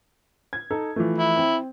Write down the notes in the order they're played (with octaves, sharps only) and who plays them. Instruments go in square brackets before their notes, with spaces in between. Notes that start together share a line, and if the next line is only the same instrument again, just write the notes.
[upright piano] G#6
D#4 A4
E3 F3 A3
[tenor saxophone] E4
[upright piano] C4